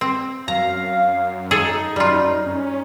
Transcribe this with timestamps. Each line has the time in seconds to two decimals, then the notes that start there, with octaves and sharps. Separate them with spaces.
0.01 C4
0.48 F#2 F5 A#5
1.51 D#4 G#4 A4
1.96 F#2 G3 F4
2.46 C#4